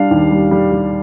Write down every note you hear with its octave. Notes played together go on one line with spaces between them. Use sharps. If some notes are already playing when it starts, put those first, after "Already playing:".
Already playing: G3 D4 F5
D#2
G3
G3
G3